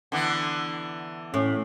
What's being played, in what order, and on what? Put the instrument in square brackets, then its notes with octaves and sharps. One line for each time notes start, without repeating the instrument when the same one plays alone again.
[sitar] D3 E3 B3
[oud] A2 [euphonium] C#4